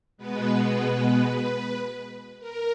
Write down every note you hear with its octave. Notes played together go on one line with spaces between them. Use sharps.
B2 G#3 B3 B4
A#4